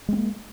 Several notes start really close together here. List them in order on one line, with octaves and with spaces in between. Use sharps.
G#3 C4 A#3